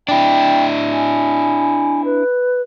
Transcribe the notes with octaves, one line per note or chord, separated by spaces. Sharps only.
D4 E4 G5
G#5
B4